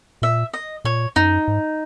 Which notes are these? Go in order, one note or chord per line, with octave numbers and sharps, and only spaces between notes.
A#2 E5
D#5
A#2 C#5
F#2 D#4
G#2